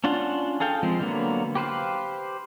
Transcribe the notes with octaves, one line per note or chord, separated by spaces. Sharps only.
C#4 D4 F4 F#5
G#4 A4 F5 G5
F3 G#3 C4
D3 F#3 A#3 B3
G4 B4 C5 F5